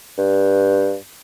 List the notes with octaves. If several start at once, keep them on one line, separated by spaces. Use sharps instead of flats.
G2